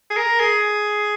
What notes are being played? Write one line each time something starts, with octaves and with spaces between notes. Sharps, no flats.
G#4
A#4
G#4